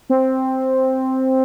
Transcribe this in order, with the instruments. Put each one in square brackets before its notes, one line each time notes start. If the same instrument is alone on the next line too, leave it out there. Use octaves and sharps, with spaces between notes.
[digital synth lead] C4